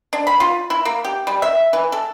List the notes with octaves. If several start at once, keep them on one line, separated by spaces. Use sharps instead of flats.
D4
B5
F4
E4
A#3
G4
G3
E5
E3
A4